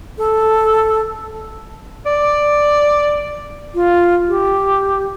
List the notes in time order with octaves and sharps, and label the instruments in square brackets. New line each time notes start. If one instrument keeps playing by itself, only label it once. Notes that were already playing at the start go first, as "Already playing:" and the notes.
[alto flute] A4
[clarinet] D5
[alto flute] F4
G4